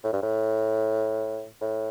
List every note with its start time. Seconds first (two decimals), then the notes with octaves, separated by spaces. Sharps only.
0.04 A2
0.13 G2
0.22 A2
1.61 A2